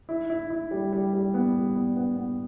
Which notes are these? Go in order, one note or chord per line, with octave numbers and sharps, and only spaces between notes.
E4
E4
E4
G3
G3
G3
B3
G3
B3
B3
B3